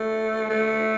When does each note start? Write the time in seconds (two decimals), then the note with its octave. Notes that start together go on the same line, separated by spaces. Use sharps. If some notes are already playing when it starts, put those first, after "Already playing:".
Already playing: A3
0.50 A3